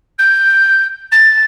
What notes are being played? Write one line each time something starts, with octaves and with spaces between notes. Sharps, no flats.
G6
A6